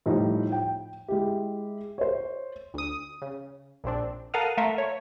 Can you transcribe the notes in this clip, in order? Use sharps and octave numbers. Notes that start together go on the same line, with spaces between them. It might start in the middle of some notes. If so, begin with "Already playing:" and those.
A2 F3 G3 D#4
G5
G#3 E4 G4
C5 C#5
D2 D#6
C#3
A#1 A#2 C4 D4
A4 A#4 F5 F#5 D#6 F6
A3 F4 A4 A#4 E5
C#5